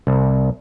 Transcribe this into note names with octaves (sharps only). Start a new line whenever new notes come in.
C2